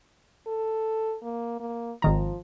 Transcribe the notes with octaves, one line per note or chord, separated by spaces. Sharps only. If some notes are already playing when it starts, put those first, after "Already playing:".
A4
A#3
A#3
G#1 D#3 F3 A#5